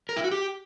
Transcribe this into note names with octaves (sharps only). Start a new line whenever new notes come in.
A#4
E4
F#4
G4